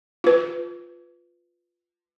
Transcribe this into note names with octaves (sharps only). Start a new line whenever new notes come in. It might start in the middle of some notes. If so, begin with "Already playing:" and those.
F4 B4